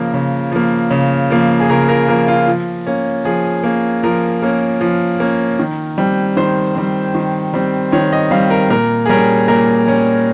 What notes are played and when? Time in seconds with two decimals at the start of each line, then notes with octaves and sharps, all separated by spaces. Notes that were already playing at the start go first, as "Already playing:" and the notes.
Already playing: C#3 F3 A#3 A#4
0.14 C#3
0.52 F3 A#3
0.91 C#3
1.30 F3 A#3
1.60 G#4
1.70 C#3 A#4
1.89 A#4
2.08 F3 A#3 A#4
2.28 F4
2.46 F3
2.86 A#3 C#4
3.25 F3 G#4
3.64 A#3 C#4
4.03 F3 A#4
4.42 A#3 C#4
4.81 F3
5.20 A#3 C#4
5.59 D#3
5.98 G3 C4
6.37 D#3 C5
6.75 G3 C4
7.15 D#3
7.54 G3 C4
7.92 D#3 C#5
8.13 D#5
8.31 G3 C4 F5
8.50 A#4
8.70 A#2 A#4
9.06 G#4
9.09 G3 C#4 A#4
9.48 A#2 A#4
9.87 G3 C#4